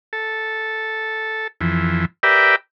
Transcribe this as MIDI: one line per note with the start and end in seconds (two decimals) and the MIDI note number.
0.13 1.47 69
1.61 2.05 41
1.61 2.05 52
2.23 2.56 67
2.23 2.56 70
2.23 2.56 71
2.23 2.56 74
2.23 2.56 76
2.23 2.56 79